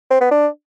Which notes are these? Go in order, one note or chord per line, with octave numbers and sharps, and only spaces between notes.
C4
B3
D4